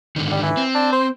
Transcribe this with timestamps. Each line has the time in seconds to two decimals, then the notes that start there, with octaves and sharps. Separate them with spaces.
0.16 G#2 D3 D#3
0.31 G3
0.43 E3
0.57 C4
0.75 D4
0.93 C5